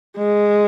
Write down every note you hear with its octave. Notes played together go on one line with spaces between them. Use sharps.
G#3